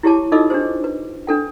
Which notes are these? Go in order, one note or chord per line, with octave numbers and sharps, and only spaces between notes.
E4 G4 G#4 C#5 A5 D6
D#4 F4 A4 D#5 D6 E6
D4 G4 G#4 C5
B4
D4 A4 G5